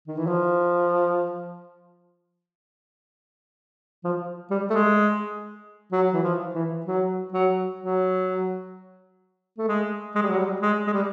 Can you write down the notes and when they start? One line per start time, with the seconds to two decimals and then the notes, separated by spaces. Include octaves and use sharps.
0.07 D#3
0.17 E3
0.27 F3
4.04 F3
4.50 G3
4.70 A3
4.73 G#3
5.92 F#3
6.13 E3
6.23 F3
6.55 E3
6.86 F#3
7.32 F#3
7.79 F#3
9.58 A3
9.68 G#3
10.15 G#3
10.22 G3
10.30 F#3
10.37 G3
10.62 G#3
10.87 G#3
10.93 G3